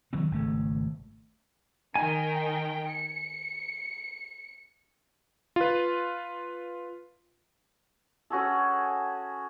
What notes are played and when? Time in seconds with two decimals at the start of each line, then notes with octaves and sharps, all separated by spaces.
0.13 D#3 F#3 C4
0.31 G#1 C#3 A3
1.96 D#3 A#4 G5 G#5
2.88 C#7
5.56 F4 B4
8.30 C#4 F#4 G#4 A4